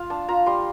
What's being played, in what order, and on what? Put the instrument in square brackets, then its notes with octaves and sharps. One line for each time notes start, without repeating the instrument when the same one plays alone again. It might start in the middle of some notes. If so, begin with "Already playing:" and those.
Already playing: [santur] F4 F5
D4 A5
F4 A#5
G3 C6